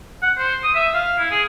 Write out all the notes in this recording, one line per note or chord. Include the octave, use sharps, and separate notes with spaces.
F#5
C5
D#6
E5
F5
E4
G#4